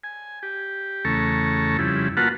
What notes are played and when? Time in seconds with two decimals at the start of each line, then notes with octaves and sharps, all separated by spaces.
0.04 G#5
0.43 G4
1.05 E2 C#3 A3 A4 A#5 C#6
1.79 F2 C#3 G3 E4
2.17 A#3 F4 F#4 B4 F#5 A5